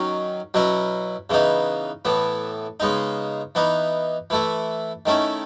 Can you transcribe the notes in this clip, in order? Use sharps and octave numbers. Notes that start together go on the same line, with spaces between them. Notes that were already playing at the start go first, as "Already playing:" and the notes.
Already playing: D#3 F#3 C#4
B2 F#3 C#4 E4
C#3 E3 B3 D#4
A2 E3 B3
C#3 G#3 B3 D#4
E3 B3 D#4
E3 A3 E4
D#3 A3 C#4 E4